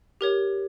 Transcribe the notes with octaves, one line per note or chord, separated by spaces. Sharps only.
G4 A#4 C#5